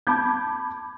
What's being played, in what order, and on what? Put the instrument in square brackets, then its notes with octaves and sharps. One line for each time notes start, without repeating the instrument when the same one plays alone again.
[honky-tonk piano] A5 B5 D6 G6 G#6